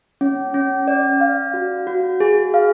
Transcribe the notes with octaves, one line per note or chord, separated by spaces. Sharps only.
C#4
C#4
D5
F5
F#4
F#4
G#4
F5